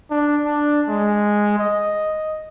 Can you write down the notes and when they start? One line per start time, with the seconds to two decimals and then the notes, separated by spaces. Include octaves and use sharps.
0.10 D4
0.44 D4
0.88 G#3
1.59 D#5